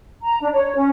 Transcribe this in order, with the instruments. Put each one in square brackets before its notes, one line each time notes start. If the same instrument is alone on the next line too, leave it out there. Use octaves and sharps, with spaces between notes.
[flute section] A#5
D4
C#5
C#4